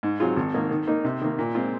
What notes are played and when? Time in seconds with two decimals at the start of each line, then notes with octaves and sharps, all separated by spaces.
0.03 G#2
0.20 F#3 C4 F4 G#4
0.36 G#1
0.54 G#2 D#3 A#3
0.71 D#3
0.87 A#3 D#4
1.04 C3
1.21 D#3 A#3
1.39 A#2
1.55 G#3 C4 F4